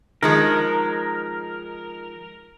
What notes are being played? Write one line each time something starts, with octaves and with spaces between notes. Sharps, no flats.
D#3 F3 G#3 A#4